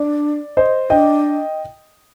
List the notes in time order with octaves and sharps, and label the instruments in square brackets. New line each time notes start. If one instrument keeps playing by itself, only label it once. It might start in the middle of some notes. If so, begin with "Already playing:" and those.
Already playing: [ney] D4 [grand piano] D5
[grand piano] C5 D#5
[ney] D4 [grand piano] D#5 G5